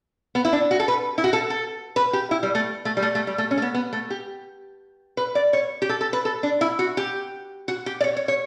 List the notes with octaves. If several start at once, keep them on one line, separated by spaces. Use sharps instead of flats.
B3
E4
D4
F#4
A4
B4
E4
F#4
A4
A4
B4
G4
E4
G3
A3
A3
G3
A3
A3
G3
A3
C#4
A3
B3
B3
A3
G4
B4
D5
C#5
G4
A4
A4
B4
A4
D4
E4
F#4
G4
F#4
G4
D5
C#5
C#5
C#5